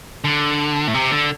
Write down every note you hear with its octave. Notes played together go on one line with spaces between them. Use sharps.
D3
A2
C3
D3